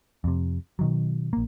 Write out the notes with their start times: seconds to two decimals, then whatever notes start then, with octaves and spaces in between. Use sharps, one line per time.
0.24 F2 C3
0.79 B2 D#3 F#3
1.33 A#1 A#3